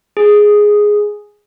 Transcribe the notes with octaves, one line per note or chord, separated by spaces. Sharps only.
G#4